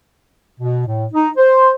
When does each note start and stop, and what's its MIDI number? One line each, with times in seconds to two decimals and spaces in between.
0.60 0.83 47
0.87 1.06 45
1.14 1.29 63
1.37 1.72 72